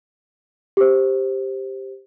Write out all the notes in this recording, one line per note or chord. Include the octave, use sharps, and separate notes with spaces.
G4 C5